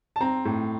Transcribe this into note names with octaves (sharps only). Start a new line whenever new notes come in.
A5
C4 A#5
A2